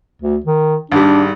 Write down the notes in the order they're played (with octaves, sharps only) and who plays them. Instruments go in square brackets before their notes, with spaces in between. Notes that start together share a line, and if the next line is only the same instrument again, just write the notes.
[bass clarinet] D2
D#3
[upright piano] G#1 G3 [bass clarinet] D4